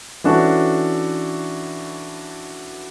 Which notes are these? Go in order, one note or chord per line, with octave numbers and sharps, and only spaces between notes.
E3 C#4 D4 F#4 A4